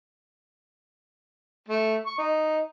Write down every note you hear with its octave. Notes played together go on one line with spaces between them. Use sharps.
A3
C#6
D#4